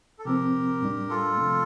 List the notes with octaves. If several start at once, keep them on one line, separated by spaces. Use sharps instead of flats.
A4
C3 F3 C4 G4 A#4
A2 G3 D4
F4 A4
C3 F3 A3